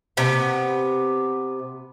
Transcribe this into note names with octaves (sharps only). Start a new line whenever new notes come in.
C3 B3